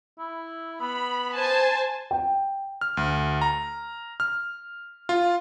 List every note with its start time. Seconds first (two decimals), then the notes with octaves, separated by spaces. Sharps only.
0.19 E4
0.81 B3 B5
1.34 C5 G#5 A5
2.11 G5
2.81 F6
2.97 D2
3.41 A#5
4.20 F6
5.09 F4